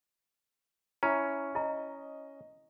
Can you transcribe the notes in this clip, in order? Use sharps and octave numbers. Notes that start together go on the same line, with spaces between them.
C#4 E4 A#5
E4 D#5 A#5